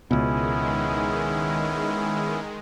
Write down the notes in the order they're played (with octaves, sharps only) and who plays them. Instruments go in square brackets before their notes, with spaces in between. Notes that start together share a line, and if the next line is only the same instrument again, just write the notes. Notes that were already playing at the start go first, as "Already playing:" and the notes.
[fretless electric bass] C#2 B2 [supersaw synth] D#3 G#3 [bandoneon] B3 C#4 E4